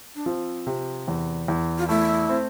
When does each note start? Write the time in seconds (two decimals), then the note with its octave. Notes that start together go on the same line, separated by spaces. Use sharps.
0.15 D4
0.26 F3 C4
0.67 C3
1.08 E2
1.48 E2
1.78 F4
1.88 A3 E4
2.29 C4